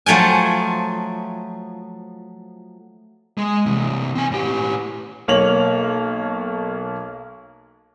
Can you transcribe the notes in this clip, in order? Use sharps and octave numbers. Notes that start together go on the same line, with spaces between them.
F3 F#3 A3 G5 G#5
G#3
C3 E3
C4 G#5
A2 G4
B1 A#3 C#5 F7 F#7